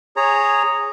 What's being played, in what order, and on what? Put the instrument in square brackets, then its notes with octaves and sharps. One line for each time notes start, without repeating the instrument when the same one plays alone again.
[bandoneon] G#4 C#5 A#5